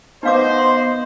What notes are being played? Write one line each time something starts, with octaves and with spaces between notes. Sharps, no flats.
B3 D#4 C5 D#5 F5 D6
C6